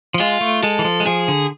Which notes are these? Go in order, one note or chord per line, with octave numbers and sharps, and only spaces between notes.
F3
G#3 F4
A3
G#3 A4
E3
F3
G#3
F3 G#4
D3